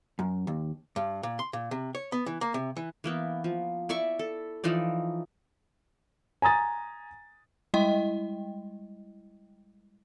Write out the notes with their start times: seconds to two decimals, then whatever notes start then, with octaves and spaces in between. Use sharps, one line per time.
0.19 F#2
0.47 D#2
0.96 G2
1.23 A#2
1.39 C6
1.53 A#2
1.71 C3
1.95 C#5
2.12 B3
2.26 E3
2.41 A#3
2.54 C3
2.77 E3
3.04 E3 A#3 B3
3.44 F3
3.89 E4 D5 E5 C#6
4.19 A4
4.64 E3 F3 D#4 D5
6.42 G#5 A#5 D#6 A6
7.74 G3 G#3 E4 D#5 G5